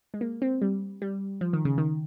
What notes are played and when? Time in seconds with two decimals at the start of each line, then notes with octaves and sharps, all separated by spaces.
0.14 G#3
0.21 A#3
0.42 C4
0.62 G3
1.02 G3
1.41 F3
1.53 D#3
1.65 C#3
1.78 D#3